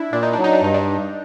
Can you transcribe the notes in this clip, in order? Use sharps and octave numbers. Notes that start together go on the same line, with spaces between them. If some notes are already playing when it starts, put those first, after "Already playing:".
Already playing: D4 E4
A#2 D4
D#4
F#3 D4
D#4
D4
G2 D#4
D4